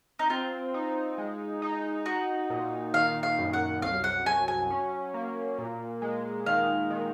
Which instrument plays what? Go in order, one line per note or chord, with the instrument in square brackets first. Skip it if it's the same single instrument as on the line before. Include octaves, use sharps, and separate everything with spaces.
[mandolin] D#4
[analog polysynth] C4 [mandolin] F4
[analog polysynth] D#4
G#3
D#4
[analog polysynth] D#4 [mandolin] F#4
[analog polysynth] A#2
[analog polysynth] D#3 [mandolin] F5
[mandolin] F5
[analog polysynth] F#2
[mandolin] F#5
[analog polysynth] C2 [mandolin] F5
[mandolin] F#5
[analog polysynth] F#3 [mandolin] G#5
[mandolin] G#5
[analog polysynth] C#4
A#3
A#2
G#3
[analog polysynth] D#3 [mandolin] F5
[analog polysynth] D#3